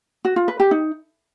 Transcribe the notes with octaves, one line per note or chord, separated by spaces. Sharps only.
F#4
F4
B4
G4
D#4